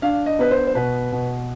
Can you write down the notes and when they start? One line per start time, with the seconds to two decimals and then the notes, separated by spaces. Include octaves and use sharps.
0.02 D4 F5
0.26 D#5
0.39 B3 B4
0.51 C5
0.67 C5
0.75 B2 B4
1.12 B2